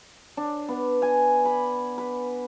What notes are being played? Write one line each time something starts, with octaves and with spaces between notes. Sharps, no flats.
D4
B3
G#5
B5
B4